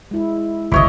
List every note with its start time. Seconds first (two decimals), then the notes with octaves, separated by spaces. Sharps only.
0.11 G#3 E4
0.72 G1 C#2 E3 E4 C#5 D#5